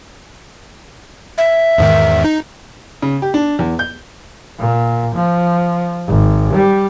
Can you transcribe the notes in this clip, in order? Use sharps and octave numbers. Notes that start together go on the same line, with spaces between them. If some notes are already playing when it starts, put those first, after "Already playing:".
E5
E2 G#2 D#3
D#4
C#3
G4
D4
E2
G6
A#2
F3
G#1
G3